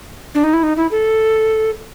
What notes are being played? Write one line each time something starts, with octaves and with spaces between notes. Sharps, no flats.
D4
D#4
E4
D#4
E4
A4